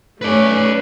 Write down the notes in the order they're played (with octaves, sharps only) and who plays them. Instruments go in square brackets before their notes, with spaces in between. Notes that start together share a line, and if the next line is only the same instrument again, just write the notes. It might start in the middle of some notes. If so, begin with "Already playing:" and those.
[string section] A3 C#4 [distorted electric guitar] B4 D5